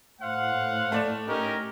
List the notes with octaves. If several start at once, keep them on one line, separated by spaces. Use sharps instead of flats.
A2 C5 F5 F#5
A3 D5 E7
C#4 D#4 G4 A#4